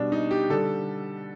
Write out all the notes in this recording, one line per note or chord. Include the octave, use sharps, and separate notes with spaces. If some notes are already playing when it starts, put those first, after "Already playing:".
Already playing: B2 G3 D4
D#4
G4
D3 G3 A4